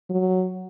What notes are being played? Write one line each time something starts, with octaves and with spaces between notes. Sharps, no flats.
F#3